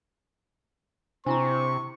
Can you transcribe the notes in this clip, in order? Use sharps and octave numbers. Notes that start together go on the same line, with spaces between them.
C3 C4 D4 E4 A#5 C#6